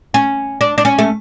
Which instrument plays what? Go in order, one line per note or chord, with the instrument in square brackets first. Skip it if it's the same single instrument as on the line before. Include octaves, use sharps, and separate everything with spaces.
[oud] C#4
D4
D4
C#4
A3